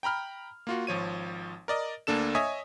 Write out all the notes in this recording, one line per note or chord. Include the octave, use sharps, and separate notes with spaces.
G5 A#5 B5 F6
A#3 F4 F#4
G#1 F3 C#5 D#7
A#4 D5 D#5
D2 A#3 D4 A4 E7
C#5 D#5 E5 G#5 D#6